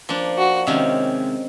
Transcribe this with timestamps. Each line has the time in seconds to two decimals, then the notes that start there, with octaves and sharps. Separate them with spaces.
0.09 F3 A#3 D4
0.38 F#4
0.67 C3 D#3 G#3 C#4